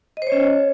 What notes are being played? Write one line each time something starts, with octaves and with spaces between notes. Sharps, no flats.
C#4 C5 C#5 D#5